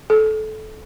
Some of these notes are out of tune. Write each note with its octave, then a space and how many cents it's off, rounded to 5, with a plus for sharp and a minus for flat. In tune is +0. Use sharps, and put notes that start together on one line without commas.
A4 -20